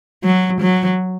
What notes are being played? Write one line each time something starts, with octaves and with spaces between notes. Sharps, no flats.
F#3
F#3